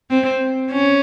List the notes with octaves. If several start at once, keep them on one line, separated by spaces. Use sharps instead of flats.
C4
C#4